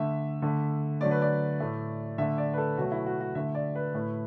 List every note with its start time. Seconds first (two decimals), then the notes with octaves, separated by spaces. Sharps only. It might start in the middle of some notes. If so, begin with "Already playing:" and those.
Already playing: D3 A3 E5
0.42 D3 A3
1.01 D3 F#3 A3 D5
1.11 B4
1.22 D5
1.60 A2 A3
2.18 D3 A3 E5
2.38 D5
2.54 B4
2.58 A4
2.78 B2 F#3 A3 F#4
2.92 E4
3.06 F#4
3.20 F#4
3.35 D3 A3 E5
3.55 D5
3.75 B4
3.94 A2 A3